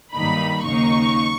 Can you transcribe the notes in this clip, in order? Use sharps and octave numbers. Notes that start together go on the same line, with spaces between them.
G2 D#3 F#3 A#3 D#4 B5
D#2 C#3 F#3 A#3 D#4 C#6